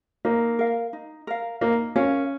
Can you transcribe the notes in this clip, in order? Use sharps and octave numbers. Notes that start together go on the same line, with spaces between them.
A#3 D#4
A#4 F5
D#4
A#4 F5
A#3 D#4
C#4 A#4 F5